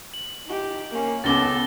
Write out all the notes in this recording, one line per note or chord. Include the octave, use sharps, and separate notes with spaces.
F#7
D#4 G4
A#3 C#4
C#2 C#3 B3 A4 D6 A6 A#6 G7